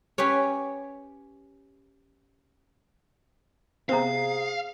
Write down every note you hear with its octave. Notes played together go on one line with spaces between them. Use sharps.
C#4 G4 B4 C#5
C3 B3 C4 G#4 C5 F5 A#5